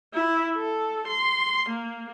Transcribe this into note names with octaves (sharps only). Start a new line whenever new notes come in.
E4
A4
C6
A#3